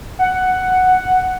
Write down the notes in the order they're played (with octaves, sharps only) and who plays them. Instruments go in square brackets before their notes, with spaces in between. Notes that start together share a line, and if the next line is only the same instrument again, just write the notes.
[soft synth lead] F#5